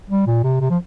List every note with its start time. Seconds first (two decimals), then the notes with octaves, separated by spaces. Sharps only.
0.10 G3
0.27 A#2
0.44 C3
0.61 C3
0.70 F3